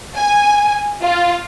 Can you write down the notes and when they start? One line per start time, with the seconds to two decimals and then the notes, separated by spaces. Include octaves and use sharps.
0.15 G#5
1.01 F4